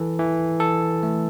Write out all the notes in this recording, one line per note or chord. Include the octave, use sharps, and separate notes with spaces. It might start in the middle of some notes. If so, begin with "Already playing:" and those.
Already playing: E3 A4
E3
A4
A3